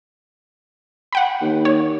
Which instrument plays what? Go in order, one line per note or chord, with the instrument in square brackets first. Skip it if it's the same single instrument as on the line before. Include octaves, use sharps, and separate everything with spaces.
[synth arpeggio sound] F#5 G5 B5
[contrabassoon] D#2
[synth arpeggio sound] C#5